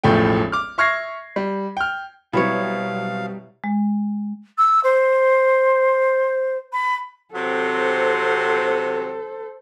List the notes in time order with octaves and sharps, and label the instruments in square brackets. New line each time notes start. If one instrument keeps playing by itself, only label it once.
[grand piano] E1 A1 A2 F3 A3 G5
D6 F6
E5 C#6 F6 G#6 A#6 C7
G3
G5 F6
[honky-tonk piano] B2 F#3 C4 [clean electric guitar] G3 [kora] E4 C#5 [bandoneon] F5
[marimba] G#3
[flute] E6
C5
B5
[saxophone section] C3 F#3 C4 [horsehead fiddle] A4 C5